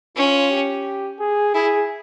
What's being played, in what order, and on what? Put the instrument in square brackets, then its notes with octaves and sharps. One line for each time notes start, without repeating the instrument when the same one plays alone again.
[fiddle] C#4 [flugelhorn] F4
[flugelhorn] G4
G#4
[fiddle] E4 [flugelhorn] G#4